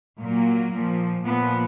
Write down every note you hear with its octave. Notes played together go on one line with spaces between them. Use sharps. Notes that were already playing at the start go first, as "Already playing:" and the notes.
A#2 F#3 A#3
A#2 F3
A#2 F3 B3